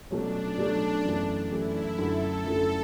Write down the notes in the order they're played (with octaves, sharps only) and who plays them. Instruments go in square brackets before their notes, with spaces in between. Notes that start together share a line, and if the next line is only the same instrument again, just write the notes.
[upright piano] B2 F#3 A3 C#4 [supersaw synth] D4
[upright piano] B2 F#3 A3 C#4
F#2 E3 A3
[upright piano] F#2 E3 A3 [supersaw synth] E4
[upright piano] F#2 D3 A3 E4 [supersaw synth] A4
[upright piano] F#2 D3 A3 E4